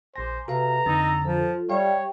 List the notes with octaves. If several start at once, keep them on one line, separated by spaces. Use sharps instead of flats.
A#1 C5 G#5 D6 A#6
C3 F#4 A4 B4 F5 A#5
F2 D3 D#4 E6 A6
F3 F4 A4
G3 G4 C#5 E5 F5 G5 C#6